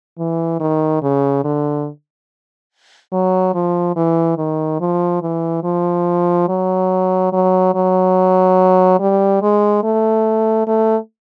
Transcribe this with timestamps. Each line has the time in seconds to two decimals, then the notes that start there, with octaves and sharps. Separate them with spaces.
0.19 E3
0.60 D#3
1.02 C#3
1.44 D3
3.13 F#3
3.54 F3
3.96 E3
4.38 D#3
4.80 F3
5.22 E3
5.64 F3
6.49 F#3
7.33 F#3
7.74 F#3
9.00 G3
9.42 G#3
9.84 A3
10.67 A3